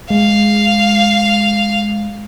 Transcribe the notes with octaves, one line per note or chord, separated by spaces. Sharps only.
G#3 F5